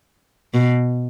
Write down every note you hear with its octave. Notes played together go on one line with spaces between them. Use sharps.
B2